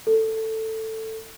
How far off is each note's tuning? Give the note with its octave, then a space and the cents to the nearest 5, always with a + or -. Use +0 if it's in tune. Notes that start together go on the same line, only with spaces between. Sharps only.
A4 +10